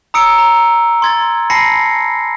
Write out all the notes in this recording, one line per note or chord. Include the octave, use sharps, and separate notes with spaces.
A#5 D#6 E6 C#7 D7
A#5
C6 G#6 A6
G#5 A5 B5 A#6 C7 C#7